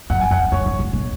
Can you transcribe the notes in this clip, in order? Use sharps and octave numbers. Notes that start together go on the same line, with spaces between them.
F#2 F#5
G#5
F2 F#5
F#2 C#5
F#2
A#2
B2